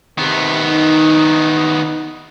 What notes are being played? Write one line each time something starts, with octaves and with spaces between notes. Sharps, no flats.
C3 D#3 B3
D#4